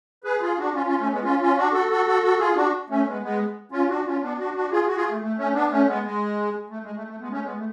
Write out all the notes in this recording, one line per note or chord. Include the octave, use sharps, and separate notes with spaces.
G#4 B4
F4 G#4
D4 F#4
C#4 F4
C#4 F4
A3 C#4
G#3 B3
C#4 F4
C#4 F4
D4 F#4
F#4 A4
F#4 A4
F#4 A4
F#4 A4
F4 G#4
D4 F#4
A3 C#4
G#3 B3
G#3 B3
C#4 F4
D4 F#4
C#4 F4
B3 D4
D4 F#4
D4 F#4
F4 G#4
F#4
F4 G#4
A3
A3
A3 C#4
B3 D4
A3 C#4
G#3 B3
G#3
A3
G#3
A3
A3
G#3 B3
A3 C#4
G#3 B3
A3